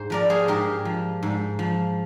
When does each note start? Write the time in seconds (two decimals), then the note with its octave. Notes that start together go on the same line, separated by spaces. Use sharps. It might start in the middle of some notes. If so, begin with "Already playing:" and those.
Already playing: G#2 C5
0.10 F3 A#4 D5
0.30 G#4 C5
0.48 G#2 G4 A#4
0.85 F3
1.23 G#2
1.59 F3